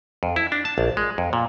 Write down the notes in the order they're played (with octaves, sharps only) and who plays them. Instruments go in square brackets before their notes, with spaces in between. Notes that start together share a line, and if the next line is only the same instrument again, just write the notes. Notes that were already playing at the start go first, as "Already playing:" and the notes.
[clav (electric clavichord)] F2
E4
D4
A5
A#1
G#3
F2
A#2